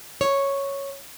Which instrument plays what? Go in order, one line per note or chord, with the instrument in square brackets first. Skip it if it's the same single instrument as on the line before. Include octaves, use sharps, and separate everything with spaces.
[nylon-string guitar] C#5